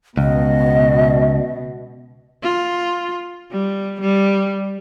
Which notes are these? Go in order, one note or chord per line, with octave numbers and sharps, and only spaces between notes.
C#2 B2 D#5
F4
G3
G3